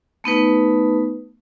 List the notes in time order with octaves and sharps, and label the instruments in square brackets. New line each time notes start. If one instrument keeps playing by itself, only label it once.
[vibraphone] A3 B3 D#4 B4